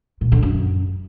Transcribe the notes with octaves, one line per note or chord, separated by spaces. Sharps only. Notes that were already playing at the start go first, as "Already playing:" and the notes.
A#2
D3
F#2